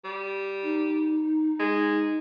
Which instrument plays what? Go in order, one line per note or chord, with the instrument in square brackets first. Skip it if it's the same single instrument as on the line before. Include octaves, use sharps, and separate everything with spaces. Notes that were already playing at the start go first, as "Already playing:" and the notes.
[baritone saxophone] G3
[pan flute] D#4
[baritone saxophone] G#3